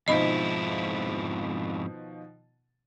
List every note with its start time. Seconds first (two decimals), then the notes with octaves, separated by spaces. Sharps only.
0.08 F2 G#2 B2 D#3 F3 E4 D#5 B5